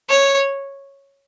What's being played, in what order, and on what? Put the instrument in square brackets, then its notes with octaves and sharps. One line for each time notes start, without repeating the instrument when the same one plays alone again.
[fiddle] C#5